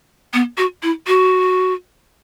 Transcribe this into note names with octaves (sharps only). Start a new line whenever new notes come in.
B3
F#4
E4
F#4